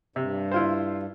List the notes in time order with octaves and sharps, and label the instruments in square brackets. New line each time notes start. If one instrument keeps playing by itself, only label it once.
[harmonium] G2 [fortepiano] C3
[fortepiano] E4 F4 C5